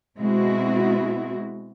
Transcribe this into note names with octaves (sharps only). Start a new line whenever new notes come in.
B2 G#3 C4 E4 F#4